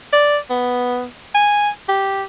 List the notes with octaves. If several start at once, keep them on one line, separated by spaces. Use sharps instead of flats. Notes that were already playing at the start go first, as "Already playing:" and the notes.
D5
B3
G#5
G4